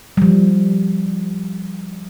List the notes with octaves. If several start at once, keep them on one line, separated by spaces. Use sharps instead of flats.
F3 G3